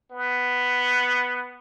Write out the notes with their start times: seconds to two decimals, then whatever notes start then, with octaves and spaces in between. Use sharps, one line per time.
0.11 B3